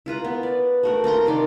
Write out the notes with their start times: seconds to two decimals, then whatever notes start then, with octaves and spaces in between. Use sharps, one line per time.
0.06 E4 F4 B4 A#5
0.24 B3
0.43 D5
0.83 A3 F#4 A#4
1.04 C4 F4 A#5 C6
1.26 C3 D#3 D5